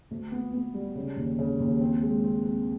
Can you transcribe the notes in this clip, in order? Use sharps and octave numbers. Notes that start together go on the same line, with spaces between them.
D2
B3
B3
G3
C#3
D#2
C#3
D#2
C4
G#3
C4
C4